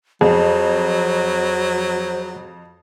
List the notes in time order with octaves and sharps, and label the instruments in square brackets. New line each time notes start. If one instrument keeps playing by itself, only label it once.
[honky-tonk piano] F2 [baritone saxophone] F#3 [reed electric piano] G#4 [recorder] C5